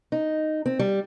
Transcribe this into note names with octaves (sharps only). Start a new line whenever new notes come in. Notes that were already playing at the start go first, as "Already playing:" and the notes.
D#4
C4
G3